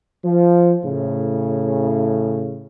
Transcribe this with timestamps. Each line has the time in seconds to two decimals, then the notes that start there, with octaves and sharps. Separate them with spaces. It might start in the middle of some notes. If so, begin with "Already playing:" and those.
0.25 F3
0.85 A2 C#3